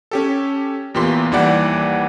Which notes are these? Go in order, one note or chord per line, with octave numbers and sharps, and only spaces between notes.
C#4 G4 A4
E2 A#2 G4 B4 C6
D#2 E3 G3 D5 F#5